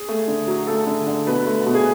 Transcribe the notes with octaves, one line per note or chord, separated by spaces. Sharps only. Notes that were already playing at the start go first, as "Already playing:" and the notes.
Already playing: G#4
A3
D3
F#3
A3 A4
D3
D3
B2 B4
A3
B2
G#4